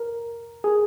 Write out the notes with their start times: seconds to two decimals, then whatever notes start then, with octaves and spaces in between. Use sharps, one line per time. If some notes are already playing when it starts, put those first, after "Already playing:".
Already playing: A#4
0.64 G#4